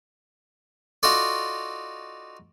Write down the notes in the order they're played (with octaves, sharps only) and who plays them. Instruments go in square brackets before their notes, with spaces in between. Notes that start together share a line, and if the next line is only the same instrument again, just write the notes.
[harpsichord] D#4 F4 F#4 A4 D5